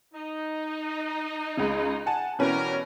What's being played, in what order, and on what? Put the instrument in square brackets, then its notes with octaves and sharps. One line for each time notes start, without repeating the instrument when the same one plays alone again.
[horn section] D#4
[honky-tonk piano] C#2 C#3
F#5 G#5 A5
[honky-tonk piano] B2 E3 C#4 [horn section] G3 F#4 A#4